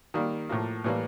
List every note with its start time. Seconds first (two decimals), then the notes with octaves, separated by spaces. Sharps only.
0.14 D#3 G3 A#3
0.49 A2 F3 A#3
0.84 A2 E3 G3 A#3